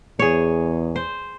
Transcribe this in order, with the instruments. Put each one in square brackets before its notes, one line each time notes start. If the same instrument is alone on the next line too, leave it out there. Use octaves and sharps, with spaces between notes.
[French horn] E2 [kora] G#4 C#5
[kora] C5